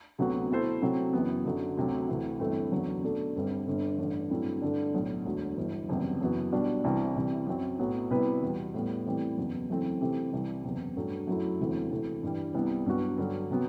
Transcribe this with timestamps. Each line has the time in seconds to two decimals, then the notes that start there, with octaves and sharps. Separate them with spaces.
0.18 D2 C3 F#3 B3 F#4
0.50 B2 A3 E4 A4 C5
0.82 C3 F#3 A3 C4
1.13 F#1 F#2 E3 B3
1.45 F#2 D3 F#3
1.77 D2 C3 F#3
2.08 D2 C3 E3
2.40 G1 G2 E3 A3 C4
2.72 F#1 E2 D3 F#3
3.03 B2 A3 D4 A4
3.36 G1 G2 D3 G3 C4
3.67 G1 G2 D3
3.98 A1 G2 D3
4.30 G2 F#3 A3 C4 E4
4.62 G2 D3 A3 D4
4.94 B1 A2 F#3
5.25 E1 D2 D3 F#3
5.57 G1 G2 E3
5.89 F#1 E2 C3 G3
6.20 F#1 F#2 E3 B3 F#4
6.52 B1 B2 G3 D4 F#4
6.84 C2 C3 E3 G3 C4
7.15 C3 E3 G3
7.47 F#2 F#3 C4
7.79 B1 A2 F#3 B3
8.10 C3 G3 B3 E4 B4
8.42 E2 B2 G3
8.74 A2 G3 B3
9.05 A2 E3 G3 C4 G4
9.37 F#1 E2 B2
9.69 F#1 F#2 E3 A3 C4
10.01 C3 E3 A3 C4 G4
10.32 C2 C3 E3 G3
10.64 F#1 E2 C3
10.96 G2 F#3 A3
11.27 F#2 F#3 A3 E4
11.59 E1 D2 C3 E3 A3
11.91 C3 E3 A3
12.23 G2 E3 G3
12.54 C2 C3 G3 B3 E4
12.86 G2 F#3 B3 F#4
13.18 G2 D3 F#3
13.51 C3 F#3 B3